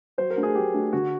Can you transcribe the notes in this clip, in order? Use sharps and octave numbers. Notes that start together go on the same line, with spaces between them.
F#3 C5
A#4
A3 D4 F#4
G#4
F#3 G4
A3 D4 F#4
D3 F#4